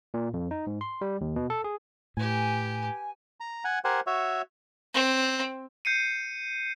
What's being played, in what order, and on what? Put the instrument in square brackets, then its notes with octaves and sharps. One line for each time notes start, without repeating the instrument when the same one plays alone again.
[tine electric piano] A#2
F2
D#4
G#2
C6
G3
D#2
B2
A4
G#4
[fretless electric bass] A2 [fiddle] G4 B4 [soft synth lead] G#5
[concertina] A#5
F#5 G#5
G4 A#4 C5 F#5 G#5
F#4 C#5 E5
[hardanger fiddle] C4
[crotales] G6 C7 C#7 D#7